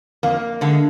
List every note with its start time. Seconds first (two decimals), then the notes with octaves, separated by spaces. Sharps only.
0.23 F2 A#3
0.61 D3 G#3